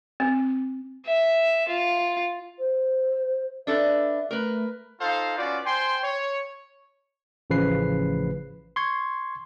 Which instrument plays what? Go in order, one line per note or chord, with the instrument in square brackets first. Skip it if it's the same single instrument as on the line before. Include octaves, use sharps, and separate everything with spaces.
[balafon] C4
[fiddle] E5
F4
[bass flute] C5
[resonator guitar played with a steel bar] D4 A4 B4 [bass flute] E5
[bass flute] A3 [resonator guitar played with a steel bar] A#4 B4
[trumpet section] D#4 F4 A4 C5 F5
C#4 F4 F#4 B4 D5
C5 G5 G#5 C6
C#5
[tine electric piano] A1 C#3 F3 B4 C7
C6 C#6 G#6